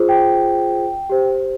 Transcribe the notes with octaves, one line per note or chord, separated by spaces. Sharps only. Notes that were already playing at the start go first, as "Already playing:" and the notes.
Already playing: F4 G#4 C5
G5
G4 C5